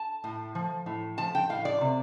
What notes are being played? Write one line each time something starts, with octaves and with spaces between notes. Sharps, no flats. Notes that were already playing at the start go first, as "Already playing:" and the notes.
Already playing: A5
A2
F3
A2
F3 A5
G5
A2 F5
D5
C3